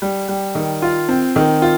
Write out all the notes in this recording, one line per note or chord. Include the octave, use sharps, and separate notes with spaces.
G3
G3
D#3
F4
C4
D#3
F4